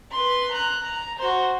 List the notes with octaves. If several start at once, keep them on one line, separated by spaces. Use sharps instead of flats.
B4 C6
A#5 F#6
A#5
F#4 C5